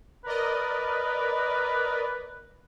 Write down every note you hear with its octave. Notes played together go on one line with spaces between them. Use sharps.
A#4 B4 D5 D#5